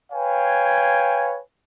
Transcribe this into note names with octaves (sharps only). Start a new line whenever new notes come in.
B4 C#5 F5 G5 G#5